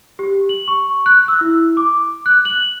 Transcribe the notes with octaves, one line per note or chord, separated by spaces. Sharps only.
G4
F#7
C#6
F#6
E6
E4
D6
F#6
F#7